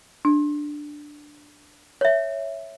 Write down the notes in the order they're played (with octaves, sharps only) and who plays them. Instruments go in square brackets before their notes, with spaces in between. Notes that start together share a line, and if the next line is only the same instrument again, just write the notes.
[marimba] D4
[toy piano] C#5 E5